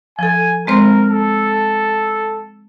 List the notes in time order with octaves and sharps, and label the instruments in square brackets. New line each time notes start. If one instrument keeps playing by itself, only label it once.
[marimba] F3 A4 [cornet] G#5
[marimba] G#3 C4 C5 [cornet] A#4
[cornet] A4